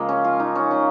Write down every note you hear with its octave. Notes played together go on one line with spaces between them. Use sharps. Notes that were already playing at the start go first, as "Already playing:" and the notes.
Already playing: C#3 F3 G#3 A#3
C#4
F4
D#4
C#4
C#4